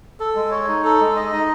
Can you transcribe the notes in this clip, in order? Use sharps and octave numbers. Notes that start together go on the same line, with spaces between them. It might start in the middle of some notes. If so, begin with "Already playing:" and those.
A4
G#3
C#5
D#4
A4
G#3
D#5
D#4